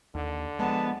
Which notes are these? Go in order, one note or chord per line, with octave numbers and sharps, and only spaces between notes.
D#2 D3
F3 G#3 B3 A5